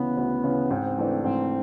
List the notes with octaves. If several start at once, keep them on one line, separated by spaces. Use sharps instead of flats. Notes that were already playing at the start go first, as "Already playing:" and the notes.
Already playing: D2 C#3 E3 B3
D2
C#3 E3
G#2 C4
E3 A3 D4
G#2 C4